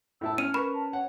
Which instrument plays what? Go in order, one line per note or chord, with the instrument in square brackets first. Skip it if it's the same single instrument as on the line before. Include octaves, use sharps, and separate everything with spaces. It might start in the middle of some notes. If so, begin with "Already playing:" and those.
[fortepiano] A2 E4 A5 [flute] E6
[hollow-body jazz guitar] C#4 [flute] F6 [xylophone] D#7
[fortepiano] A#4 B4 [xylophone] B5 [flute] C#6
[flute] A5
[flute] C#5 [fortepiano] F#5